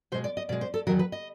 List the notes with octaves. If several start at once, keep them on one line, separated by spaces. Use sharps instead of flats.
B2 G#3 C5
D5
D#5
B2 G#3 D5
C5
A4
E2 C3 D#3 F#3 A#4
B4
D#5